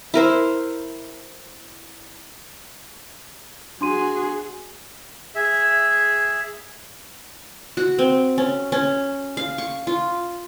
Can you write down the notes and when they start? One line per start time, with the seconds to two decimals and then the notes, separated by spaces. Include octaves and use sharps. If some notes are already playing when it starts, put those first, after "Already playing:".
0.14 E4 A#4 C5
3.81 D4 F#4 G#4 C6 D#7
5.35 G#4 E5
7.77 F#4
7.99 C4
8.38 C#4
8.72 C#4
9.37 F5
9.58 C#6
9.87 F4